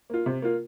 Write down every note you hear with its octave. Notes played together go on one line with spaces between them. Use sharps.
A#3 F4
C3
A#3 F4